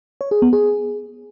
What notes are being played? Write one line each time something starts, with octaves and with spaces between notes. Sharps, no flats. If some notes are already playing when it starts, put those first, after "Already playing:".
C#5
G#4
B3
G#4